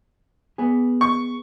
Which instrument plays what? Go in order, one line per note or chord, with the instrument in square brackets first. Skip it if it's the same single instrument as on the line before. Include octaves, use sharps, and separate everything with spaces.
[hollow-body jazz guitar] B3 G#4
[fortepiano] C#6